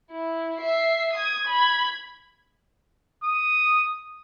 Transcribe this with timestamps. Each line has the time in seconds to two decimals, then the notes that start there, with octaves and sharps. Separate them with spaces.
0.11 E4
0.60 E5 C7
1.13 D#6 G#6
1.47 B5 G#6
3.24 D#6